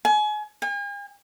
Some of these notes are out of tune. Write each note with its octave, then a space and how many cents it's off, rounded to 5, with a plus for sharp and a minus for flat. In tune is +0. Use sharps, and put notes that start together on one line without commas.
G#5 +30
G#5 -45